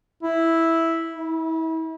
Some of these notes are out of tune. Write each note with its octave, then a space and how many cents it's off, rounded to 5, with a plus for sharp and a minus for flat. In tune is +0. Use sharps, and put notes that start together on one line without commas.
E4 -5
E4 -35